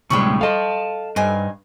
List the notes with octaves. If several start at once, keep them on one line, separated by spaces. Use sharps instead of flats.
D2 A2 C3 G3 G#3 G5 B5 C#6
A4 D#5 F5 A5
G2 D#4 C5 G#5